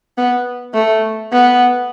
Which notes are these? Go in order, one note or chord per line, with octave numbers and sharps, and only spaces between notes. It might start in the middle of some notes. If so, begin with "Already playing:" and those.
B3
A3
B3